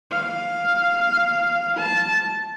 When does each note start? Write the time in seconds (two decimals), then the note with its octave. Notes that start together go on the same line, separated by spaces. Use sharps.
0.11 F5
1.78 A5